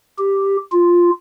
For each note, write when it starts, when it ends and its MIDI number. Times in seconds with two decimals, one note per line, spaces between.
0.19 0.57 67
0.72 1.10 65